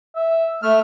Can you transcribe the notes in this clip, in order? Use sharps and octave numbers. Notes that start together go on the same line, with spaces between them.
E5
A3 E5 F6